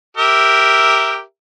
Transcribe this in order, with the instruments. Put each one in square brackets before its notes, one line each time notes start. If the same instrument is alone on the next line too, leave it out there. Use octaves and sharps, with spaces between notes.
[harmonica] G4 A#4 E5